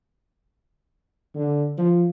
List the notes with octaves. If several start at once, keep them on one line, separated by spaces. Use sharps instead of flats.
D3
F3